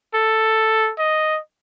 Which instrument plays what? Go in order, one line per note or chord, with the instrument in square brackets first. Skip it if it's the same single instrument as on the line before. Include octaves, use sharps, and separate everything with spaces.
[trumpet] A4
D#5